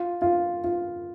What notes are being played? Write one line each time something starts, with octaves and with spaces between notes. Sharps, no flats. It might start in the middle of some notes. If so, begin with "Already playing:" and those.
Already playing: F4
F4
F4